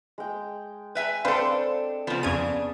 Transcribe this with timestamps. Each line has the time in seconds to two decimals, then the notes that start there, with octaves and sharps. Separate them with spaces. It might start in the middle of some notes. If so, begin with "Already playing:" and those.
0.18 G#3 G5
0.95 B4 E5 G#5
1.25 C4 D4 A4 B4 C5 F5
2.07 C#3 F3 B3 G#5
2.23 F2 C#3 D4 G#4 F5 A5 G#6 D#7